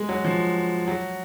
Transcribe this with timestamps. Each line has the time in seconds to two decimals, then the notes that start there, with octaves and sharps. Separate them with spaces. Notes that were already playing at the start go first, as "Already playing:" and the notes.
Already playing: G#3
0.09 F#3
0.24 F3
0.88 F#3